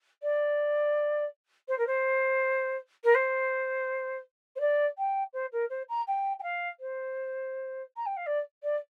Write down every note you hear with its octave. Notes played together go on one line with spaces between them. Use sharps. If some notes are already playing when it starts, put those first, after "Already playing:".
D5
C5
A#4
C5
A#4
C5
C5
D5
G5
C5
A#4
C5
A#5
G5
G5
F5
C5
A#5
G5
F5
D5
D5